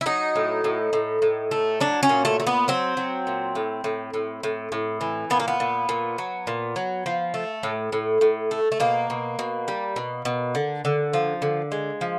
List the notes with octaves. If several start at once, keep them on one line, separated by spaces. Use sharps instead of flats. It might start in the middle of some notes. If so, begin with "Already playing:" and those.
E4
F#3 D#4
A2
A2
A2
A2
A3
F#3 D4
C#4
A#2
A3
A3
B3
F#3 C4
F#3
A#2
A2
A2
A2
A2
A2
E3
A#2 B3
A#3
B3
A#2
A#2
F#3
A#2
F#3
F3
A3
A2
A2
A2
A3
A3
B2 A#3
B2
B2
G3
B2
B2
D3
D3
F3
D3
G#3
F3